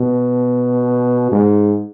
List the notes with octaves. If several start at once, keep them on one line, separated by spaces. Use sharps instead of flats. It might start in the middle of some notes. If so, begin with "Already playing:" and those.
Already playing: B2
G#2